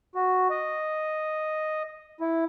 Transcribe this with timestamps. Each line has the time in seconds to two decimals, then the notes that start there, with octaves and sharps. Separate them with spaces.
0.15 F#4
0.50 D#5
2.21 E4